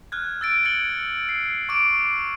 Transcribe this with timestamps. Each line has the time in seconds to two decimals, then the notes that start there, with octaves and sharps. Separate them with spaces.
0.12 F6 F#6 G#6
0.41 E6 A6 D7
0.65 G#6 A6 C#7 F#7 G7
1.29 C7
1.69 C#6 D6 D7